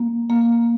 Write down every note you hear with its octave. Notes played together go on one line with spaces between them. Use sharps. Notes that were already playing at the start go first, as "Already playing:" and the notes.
Already playing: A#3
A#3